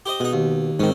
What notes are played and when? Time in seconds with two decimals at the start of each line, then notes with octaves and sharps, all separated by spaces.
0.06 G4 C5 D#5
0.20 B2 G#3 D#4
0.33 D#2
0.79 G#2 D#3 C4 C#4